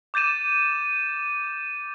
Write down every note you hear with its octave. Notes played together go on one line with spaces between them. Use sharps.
D6 G6 A6 D#7 E7